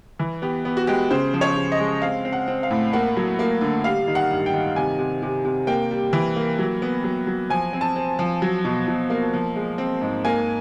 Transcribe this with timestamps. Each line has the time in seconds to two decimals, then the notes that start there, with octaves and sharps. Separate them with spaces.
0.19 E3
0.42 B3 G4
0.65 B3
0.77 F#4
0.87 G#3 G4
1.11 C#3 C5
1.34 F3
1.41 C#5
1.56 C#3
1.72 D#5
1.80 G#3
2.02 C4 F5
2.25 C4
2.33 F#5
2.48 C4
2.63 F5
2.71 A2
2.93 A#3 F#5
3.17 F#3
3.39 A#3
3.61 D3
3.84 G3 F5
4.08 D#3
4.15 F#5
4.31 G2
4.46 G5
4.53 D#3
4.76 C3 G#5
4.99 C3
5.22 C3
5.45 C3
5.67 A#3 G5
5.91 G3
6.13 E3
6.36 A#3
6.58 F#3
6.82 B3
7.04 F#3
7.27 F#3
7.50 F3 G#5
7.73 C4
7.81 A5
7.96 C4
8.19 F3
8.42 F#3
8.65 B2
8.88 B2
9.10 A#3
9.33 F3
9.56 G#3
9.78 C4
10.01 G#2
10.25 A#3 G#5